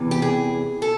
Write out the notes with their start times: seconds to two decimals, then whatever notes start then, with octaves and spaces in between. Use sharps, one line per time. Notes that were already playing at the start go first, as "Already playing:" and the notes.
Already playing: E2 C3 E3
0.11 G4
0.22 G#4
0.82 A4